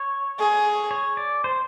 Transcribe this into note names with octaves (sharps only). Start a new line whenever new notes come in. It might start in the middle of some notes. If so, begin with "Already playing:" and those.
Already playing: C#5
G#4
C#5
D5
C5